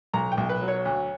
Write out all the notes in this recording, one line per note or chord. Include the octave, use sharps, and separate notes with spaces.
B1 A#5
G5
B1
B4
F#3
C#5
D2